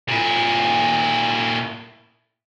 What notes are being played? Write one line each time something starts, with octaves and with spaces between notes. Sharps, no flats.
A#2 E4